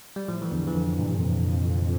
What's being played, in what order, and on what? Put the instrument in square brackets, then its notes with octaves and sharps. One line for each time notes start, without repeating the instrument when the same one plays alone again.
[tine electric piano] G3
[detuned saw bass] A2 [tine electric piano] F3
[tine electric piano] E3
[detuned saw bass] E2 [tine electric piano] D3
[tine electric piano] E3
[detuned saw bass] F2 [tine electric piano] D3
[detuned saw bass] G2 [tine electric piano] A#2
[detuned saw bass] G2 [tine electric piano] C3
[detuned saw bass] F2 [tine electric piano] A#2